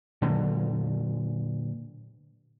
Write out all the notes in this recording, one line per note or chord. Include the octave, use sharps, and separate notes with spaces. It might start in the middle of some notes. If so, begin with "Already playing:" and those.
A#2 D3 F#3 A#3